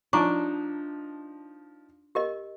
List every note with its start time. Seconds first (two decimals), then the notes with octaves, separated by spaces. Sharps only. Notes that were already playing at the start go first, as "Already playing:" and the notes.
0.13 F3 D4 D#4 A#5 C#6 D6
2.15 G4 A#4 D#5